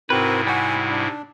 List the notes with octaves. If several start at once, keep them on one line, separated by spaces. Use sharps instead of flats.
G#2 C3 C4 E4 F#4 A#4 B4
G3 F#4 F#5 G#5
D4